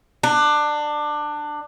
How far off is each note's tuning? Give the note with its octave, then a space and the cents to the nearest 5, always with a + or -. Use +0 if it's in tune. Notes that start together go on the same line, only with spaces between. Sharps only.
D4 +20